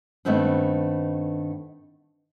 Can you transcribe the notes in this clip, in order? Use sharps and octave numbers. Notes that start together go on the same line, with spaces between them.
G2 D#3 A3 B3 C4 D4